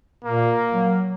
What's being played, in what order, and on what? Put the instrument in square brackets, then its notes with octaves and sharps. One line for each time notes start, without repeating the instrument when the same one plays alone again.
[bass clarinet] A#2 [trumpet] A#3
[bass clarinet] F#3